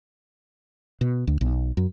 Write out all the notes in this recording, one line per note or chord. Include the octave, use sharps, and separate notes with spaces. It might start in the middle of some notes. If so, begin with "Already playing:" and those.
B2
D2
B1
F#2